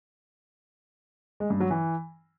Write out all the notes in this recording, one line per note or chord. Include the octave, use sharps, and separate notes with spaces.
G#3
G2
F#3
E3